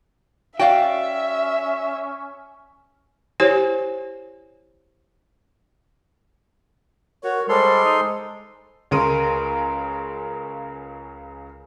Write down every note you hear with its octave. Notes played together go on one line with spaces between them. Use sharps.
C#4 F#4 D5 E5 F5 G5
E4 G4 C5 C#5 G#5
F#4 A#4 C#5
G3 G#3 A4 C5 C6
D#4
C#2 C#3 A#4 C6 D#7